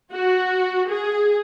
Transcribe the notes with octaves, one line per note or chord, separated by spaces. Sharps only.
F#4
G#4